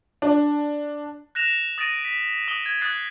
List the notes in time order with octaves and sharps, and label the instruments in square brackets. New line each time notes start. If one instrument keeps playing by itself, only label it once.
[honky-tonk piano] D4
[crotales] F#6 A#6 E7 F7
D#6 A6 A#6 D7 D#7
B6
D#6 G7
G#6
D#6 F#6 A6 C7